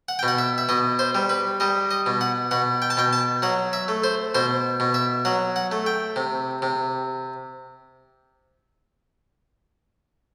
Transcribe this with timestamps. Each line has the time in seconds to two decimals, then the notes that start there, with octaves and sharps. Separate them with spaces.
0.08 F#5
0.19 B2 G5
0.28 F#5
0.38 E5
0.58 E5
0.69 B2 D#5
0.99 C5
1.15 G3
1.29 B4
1.60 G3 D#5
1.91 D#5
2.06 B2
2.21 F#5
2.51 B2 F#5
2.82 G5
2.90 A5
2.97 B2 G5
3.13 A5
3.42 F#3 F#5
3.73 E5
3.88 A3
4.04 C5
4.35 B2 C5
4.80 B2
4.94 E5
5.25 F#3 F#5
5.56 F#5
5.72 A3
5.86 G5
6.16 C3
6.62 C3